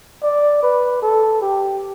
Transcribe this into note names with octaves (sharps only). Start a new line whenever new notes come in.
D5
B4
A4
G4